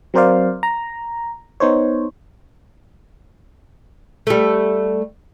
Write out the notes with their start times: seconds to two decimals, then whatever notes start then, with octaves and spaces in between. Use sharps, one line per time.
0.14 F#3 C4 A#4 C5 D5 F5
0.63 A#5
1.60 B3 D#4 C5 C#5
4.27 G3 A3